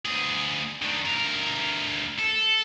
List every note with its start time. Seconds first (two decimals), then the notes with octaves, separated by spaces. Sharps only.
0.06 D2 G#4
0.82 D#3 D4
1.06 D2 A#4
2.19 A4